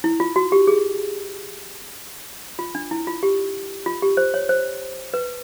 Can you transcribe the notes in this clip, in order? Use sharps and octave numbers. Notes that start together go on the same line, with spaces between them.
E4
F4
F#4
G4
G#4
F4
D4
E4
F4
G4
F4
G4
C5
C#5
C5
B4